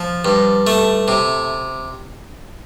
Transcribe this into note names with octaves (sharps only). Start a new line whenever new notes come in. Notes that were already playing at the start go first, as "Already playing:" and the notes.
Already playing: F3
G2
A3
C3